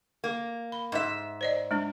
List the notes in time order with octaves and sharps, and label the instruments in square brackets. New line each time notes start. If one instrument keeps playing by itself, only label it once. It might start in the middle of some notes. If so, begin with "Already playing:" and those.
[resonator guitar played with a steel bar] A#3
[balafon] B5
[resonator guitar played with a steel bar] G#2 E5
[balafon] C5 D5 D#5
G#3 D4